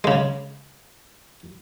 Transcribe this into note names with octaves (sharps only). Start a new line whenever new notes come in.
C#3 G#3